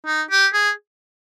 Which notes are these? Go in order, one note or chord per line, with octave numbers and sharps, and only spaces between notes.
D#4
G4
G#4